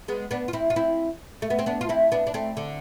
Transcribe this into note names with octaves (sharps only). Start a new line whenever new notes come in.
G#3 B3
B3 D4
F4
C4 E4
F4
C4 E4
A3
B3
C4
B3 D4
F4
C4 E4
B3 D4
D4
A3 C4
D3